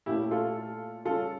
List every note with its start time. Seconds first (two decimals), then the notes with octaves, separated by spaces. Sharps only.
0.06 A#2 A3 C#4 E4 G4
0.31 F4 A4
1.05 C#3 G3 C#4 F4 A4